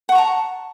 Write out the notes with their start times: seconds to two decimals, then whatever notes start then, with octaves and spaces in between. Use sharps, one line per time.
0.09 F#5
0.12 C#6
0.15 A#5
0.18 A5